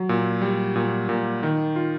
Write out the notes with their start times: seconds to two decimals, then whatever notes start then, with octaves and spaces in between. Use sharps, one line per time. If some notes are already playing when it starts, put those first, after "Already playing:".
Already playing: F#3
0.09 A#2
0.42 G3
0.76 A#2
1.09 A#2
1.43 D#3
1.76 F4